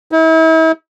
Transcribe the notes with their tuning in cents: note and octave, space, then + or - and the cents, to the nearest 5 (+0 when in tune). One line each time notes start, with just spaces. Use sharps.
E4 -40